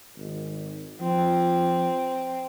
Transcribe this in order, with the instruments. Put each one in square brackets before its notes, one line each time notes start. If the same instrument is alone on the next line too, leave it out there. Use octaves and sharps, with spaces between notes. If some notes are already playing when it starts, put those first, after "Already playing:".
[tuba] G#1
[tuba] F3 [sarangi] C4